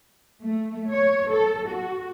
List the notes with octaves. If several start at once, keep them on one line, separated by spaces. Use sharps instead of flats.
A3
C#5
A4
F#4